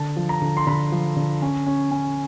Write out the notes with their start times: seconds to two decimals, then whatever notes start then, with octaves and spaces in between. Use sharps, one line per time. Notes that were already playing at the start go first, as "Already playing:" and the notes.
Already playing: D3 A5
0.16 F3
0.29 A#5
0.42 D3
0.57 C6
0.67 D3 B5
0.92 F3
1.16 D3
1.42 C#4
1.67 C#4
1.91 C#4